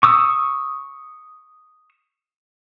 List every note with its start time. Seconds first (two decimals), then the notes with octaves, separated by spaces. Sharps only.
0.03 C#6 D#6 E6